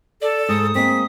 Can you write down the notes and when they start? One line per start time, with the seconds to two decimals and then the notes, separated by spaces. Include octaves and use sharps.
0.22 A4 D5
0.49 G#2 D#6
0.75 G#3 A#3 C4 B6